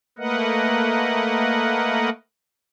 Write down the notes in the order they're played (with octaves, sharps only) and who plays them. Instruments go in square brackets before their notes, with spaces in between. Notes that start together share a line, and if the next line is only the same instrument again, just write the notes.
[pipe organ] A3 A#3 A#4 B4 D#5 F#5